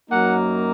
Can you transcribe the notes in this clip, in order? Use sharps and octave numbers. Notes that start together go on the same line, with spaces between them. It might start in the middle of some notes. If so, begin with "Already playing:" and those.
F#2 F#3 A#3 D#4 F#5